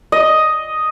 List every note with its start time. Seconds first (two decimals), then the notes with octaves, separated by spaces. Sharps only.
0.12 D#5